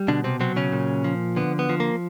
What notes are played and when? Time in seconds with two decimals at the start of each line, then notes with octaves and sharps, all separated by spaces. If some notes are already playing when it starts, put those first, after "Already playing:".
Already playing: G3
0.08 B2 D3 D4
0.24 C3 C4
0.40 C3 F#3 C4
0.56 C#3 C#4
0.72 A#2
1.04 F3
1.36 D3 B3
1.59 B3
1.70 F3
1.80 A#3